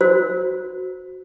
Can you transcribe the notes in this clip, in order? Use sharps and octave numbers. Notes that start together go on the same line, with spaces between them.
F#4 C5